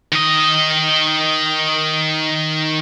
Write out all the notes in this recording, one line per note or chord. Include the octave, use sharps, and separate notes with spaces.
D#3 D#5